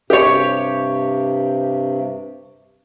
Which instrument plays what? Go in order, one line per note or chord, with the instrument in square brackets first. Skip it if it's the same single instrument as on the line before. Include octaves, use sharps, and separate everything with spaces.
[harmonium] G2 C3 [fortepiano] G4 C#5